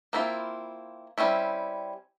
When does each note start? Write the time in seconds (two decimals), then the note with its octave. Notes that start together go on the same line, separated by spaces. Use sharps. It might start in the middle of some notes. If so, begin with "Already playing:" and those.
0.13 A#3 C4 E4 F4 B5
1.18 G3 C4 C#4 E4